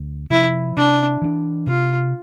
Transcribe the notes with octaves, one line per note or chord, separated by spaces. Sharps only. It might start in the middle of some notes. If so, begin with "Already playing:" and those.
Already playing: D2
C3 F3 E4
C3 D4
E3 A#3 D4
C3 F4